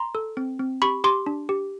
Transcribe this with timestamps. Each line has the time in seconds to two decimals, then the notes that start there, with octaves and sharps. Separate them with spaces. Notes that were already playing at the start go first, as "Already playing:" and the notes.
Already playing: A#5 C6
0.15 A4
0.37 C4
0.59 C4
0.82 G4 B5 C#6
1.04 G4 C6 D6
1.26 D4
1.49 G4